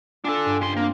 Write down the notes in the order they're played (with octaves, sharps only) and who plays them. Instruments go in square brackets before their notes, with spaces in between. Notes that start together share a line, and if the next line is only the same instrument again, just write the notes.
[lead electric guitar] D4 A4 [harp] F4 G#5 A6
[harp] G2
[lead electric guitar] C#3 C6
[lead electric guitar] A#3 [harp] C4 D4